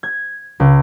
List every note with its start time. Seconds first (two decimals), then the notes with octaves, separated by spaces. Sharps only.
0.03 G#6
0.60 C#2